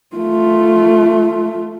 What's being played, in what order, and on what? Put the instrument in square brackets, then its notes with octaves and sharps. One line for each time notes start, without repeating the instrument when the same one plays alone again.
[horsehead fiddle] A3 F4